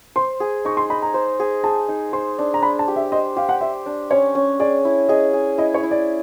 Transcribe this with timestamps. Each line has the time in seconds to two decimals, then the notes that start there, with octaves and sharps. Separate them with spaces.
0.16 C5 C6
0.40 G#4
0.65 D#4 C#6
0.77 C6
0.90 D#4 B5
1.02 A#5
1.14 C5
1.40 G#4
1.64 G#4 A5
1.89 D#4
2.13 C5 C6
2.39 D4
2.54 A#5
2.62 D4 B5
2.79 A5
2.88 G4
2.96 E5
3.12 C5 D#5
3.36 G4 F5
3.49 F#5
3.61 C5 E5
3.86 D4
4.11 C#4 C#5
4.35 C#4
4.59 G#4 D5
4.85 E4
5.09 G#4 D#5
5.33 G#4
5.58 E4 D#5
5.74 C#5
5.83 E4
5.91 D5